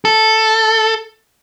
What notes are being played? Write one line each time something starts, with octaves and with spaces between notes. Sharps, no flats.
A4